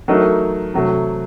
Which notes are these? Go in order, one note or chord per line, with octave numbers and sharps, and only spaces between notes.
F#3 A3 D#4 A#4
C3 F#3 A3